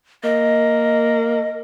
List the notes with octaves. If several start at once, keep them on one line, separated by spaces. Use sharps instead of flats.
A#3 D#5